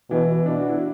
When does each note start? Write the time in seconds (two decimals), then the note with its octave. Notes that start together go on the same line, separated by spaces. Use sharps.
0.11 B2 E3
0.46 B2 D4
0.60 F#4
0.69 E4